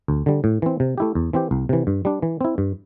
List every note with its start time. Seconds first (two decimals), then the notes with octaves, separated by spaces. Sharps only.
0.08 D2
0.26 D3 G3
0.44 A2
0.62 E3 C4
0.80 C3
0.98 A3 E4 G4
1.15 E2
1.33 E3 C4 G4
1.51 C2
1.69 C3 E3
1.87 G2
2.05 G3 D4
2.22 E3
2.41 C4 E4
2.58 G2